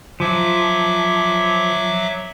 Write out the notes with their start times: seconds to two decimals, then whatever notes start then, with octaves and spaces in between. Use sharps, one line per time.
0.20 F3 F#3 E5 D6